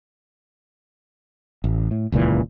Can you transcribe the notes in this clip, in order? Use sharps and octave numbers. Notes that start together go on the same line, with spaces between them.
A1
A2
D#1 C#2 A#2 E3